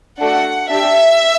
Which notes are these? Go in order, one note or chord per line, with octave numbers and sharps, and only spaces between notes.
A3 D4 F#4 A4 F#5
D4 G4 E5